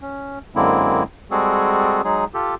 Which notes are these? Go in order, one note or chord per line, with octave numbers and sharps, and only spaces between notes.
C#4
F#2 D3 G#3 A#3 C4 E4
G3 G#3 C4 F#4 G#4 A4
F#3 G#3 D#4 G#4
F4 G4 A4